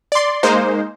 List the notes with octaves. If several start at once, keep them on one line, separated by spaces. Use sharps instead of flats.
D5 C6
G#3 A#3 D#4 C5